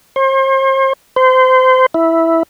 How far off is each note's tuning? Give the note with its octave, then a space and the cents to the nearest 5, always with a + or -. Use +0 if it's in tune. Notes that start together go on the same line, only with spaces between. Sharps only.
C5 +40
C5 -25
E4 -5